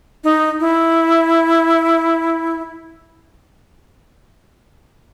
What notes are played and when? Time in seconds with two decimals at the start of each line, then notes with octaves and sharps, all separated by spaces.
0.24 D#4
0.60 E4